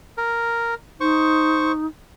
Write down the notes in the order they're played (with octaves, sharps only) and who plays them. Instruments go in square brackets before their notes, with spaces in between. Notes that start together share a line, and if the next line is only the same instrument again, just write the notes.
[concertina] A#4
[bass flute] D#4 [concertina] C5 C#6